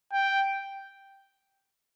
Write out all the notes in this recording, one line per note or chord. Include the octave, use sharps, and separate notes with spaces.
G5